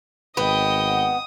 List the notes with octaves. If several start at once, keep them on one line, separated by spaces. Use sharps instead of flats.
G#1 B3 D#5 G5 D#6